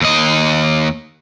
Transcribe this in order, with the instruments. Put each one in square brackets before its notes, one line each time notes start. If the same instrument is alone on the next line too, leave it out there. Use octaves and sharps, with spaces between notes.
[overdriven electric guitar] D#2 D#5